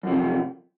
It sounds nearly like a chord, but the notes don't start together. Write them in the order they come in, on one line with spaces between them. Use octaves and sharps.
F#2 F3 C3